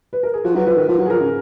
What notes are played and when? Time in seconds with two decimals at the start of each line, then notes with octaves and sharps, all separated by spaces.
0.13 B4
0.23 A#4
0.34 G#4
0.44 F3 F#4
0.55 F#3 B4
0.66 F3 B4
0.77 D#3 A#4
0.88 F3 B4
0.99 F#3
1.06 G#4
1.10 F3 A#4
1.21 C#3